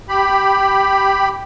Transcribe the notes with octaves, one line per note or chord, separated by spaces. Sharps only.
G4 B5